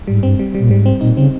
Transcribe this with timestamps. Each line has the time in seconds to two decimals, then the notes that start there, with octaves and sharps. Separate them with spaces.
0.07 G#2 G3
0.23 G2 C4
0.39 G3
0.55 A#2 G3
0.71 G#2 G3
0.86 C4
1.01 A#2 D#4
1.17 C#3 C4